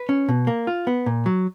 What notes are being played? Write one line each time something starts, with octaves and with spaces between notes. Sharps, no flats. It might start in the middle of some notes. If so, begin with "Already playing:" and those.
Already playing: B4
C#4
B2
A#3
F4
B3
A#2
F#3